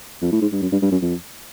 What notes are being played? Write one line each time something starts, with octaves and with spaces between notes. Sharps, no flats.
F2
A2
G#2
G2
F#2
G2
G2
F#2
F2